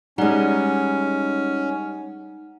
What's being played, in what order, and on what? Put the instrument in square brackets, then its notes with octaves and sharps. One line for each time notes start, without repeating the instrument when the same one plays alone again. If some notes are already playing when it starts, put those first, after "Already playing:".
[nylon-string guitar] G3 G#3 [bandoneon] C#4 [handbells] D#4 F#5